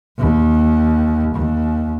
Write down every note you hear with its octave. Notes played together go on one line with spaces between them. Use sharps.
D#2
D#2